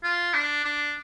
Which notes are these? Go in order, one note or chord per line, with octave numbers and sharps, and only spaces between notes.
F4
D4
D4